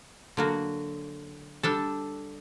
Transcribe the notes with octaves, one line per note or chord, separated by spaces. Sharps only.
D3 F#3 A#3 F#4
G3 D4 A4